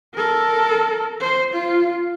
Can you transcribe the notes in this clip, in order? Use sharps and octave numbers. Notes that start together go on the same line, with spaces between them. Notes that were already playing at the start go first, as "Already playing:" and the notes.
A4 A#4
C5
F4